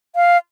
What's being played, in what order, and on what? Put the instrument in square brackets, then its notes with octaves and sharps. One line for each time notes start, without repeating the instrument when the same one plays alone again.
[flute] F5